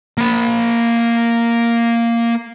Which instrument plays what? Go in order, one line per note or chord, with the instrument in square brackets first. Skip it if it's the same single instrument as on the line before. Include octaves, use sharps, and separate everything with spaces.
[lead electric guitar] A#3 B5